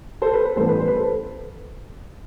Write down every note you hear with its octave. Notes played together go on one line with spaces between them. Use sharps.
A4 C5
B4
B4
A1 G2 E3 B3 A4 C5
B4
C5
B4
A4